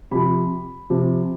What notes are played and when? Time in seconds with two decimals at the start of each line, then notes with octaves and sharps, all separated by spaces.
0.11 C3 F3 B5
0.90 C3 F3